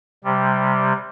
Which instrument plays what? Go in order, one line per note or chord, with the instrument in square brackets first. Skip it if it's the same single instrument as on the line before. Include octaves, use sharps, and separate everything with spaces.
[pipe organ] C3 G3